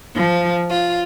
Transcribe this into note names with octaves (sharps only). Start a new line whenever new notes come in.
F3
F4